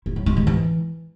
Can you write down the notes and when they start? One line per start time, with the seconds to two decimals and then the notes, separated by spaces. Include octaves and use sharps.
0.06 E4
0.16 F#3
0.26 G#3
0.37 D#3
0.47 E3